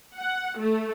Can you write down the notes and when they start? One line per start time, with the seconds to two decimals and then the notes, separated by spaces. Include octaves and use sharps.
0.16 F#5
0.58 A3